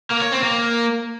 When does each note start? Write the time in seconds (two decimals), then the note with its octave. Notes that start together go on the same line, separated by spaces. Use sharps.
0.11 A#3
0.21 C#5
0.32 C4
0.42 A#3